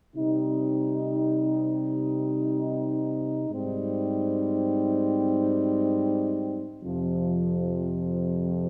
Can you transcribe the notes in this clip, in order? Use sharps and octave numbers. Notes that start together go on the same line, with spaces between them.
C3 G3 C4 D#4
G#2 G3 C4 D#4
F2 C3 F3